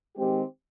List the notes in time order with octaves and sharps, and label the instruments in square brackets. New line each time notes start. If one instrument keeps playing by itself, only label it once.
[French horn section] D#3 G#3 C4 G4